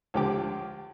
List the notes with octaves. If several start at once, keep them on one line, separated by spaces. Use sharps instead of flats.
C#2 D3 F3 G4 G5 D6